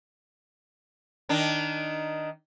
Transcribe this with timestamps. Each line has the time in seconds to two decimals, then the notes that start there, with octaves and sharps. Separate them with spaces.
1.29 D#3 D4